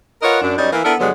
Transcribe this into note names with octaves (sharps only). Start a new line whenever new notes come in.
F4 A#4 B4 C#5 D#5 F#5
F#2 D4
F#2 G3 C#4 D#4
E3 A#3
B3 D4 E4 A4 A#4
G2 D3 F#3 G#3 B3 F#5